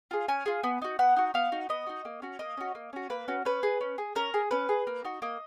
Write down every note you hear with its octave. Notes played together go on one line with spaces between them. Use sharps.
F4 G#4
C#4 G#5
F4 G#4
B3
D#4 F#4
B3 F#5
D#4 F#4
B3 F5
D#4 F#4
B3 D#5
D#4 F#4
A#3
C#4 F#4
A#3 D#5
C#4 F#4
A#3
C#4 F#4
A#3 B4
C#4 F#4
C#4 B4
G#4
C#4
G#4
C#4 A#4
G#4
C#4 B4
G#4
A#3
D#4 F#4
A#3 D#5